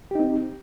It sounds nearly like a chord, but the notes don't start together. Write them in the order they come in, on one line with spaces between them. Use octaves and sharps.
G4 D#4 C4